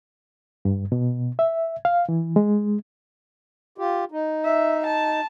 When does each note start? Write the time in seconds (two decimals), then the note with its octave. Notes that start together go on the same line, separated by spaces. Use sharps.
0.65 G2
0.92 B2
1.39 E5
1.85 F5
2.09 E3
2.36 G#3
3.78 F4 G4
4.11 D#4
4.45 E5
4.86 A5